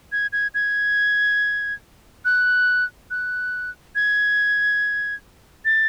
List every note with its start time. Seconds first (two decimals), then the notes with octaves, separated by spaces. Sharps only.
0.12 G#6
0.33 G#6
0.54 G#6
2.25 F#6
3.11 F#6
3.95 G#6
5.65 A6